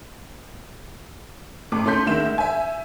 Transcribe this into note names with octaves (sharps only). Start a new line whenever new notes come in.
A1 A3 D6
A3 C#4 A4 C6 G6 B6
D2 D#3 G#3 E5 E7
E5 G#5